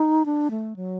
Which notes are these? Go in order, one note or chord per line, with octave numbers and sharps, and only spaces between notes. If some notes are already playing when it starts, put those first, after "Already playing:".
Already playing: D#4
D4
A3
F#3